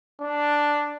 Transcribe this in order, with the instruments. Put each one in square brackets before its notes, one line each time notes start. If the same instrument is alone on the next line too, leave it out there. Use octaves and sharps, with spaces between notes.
[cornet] D4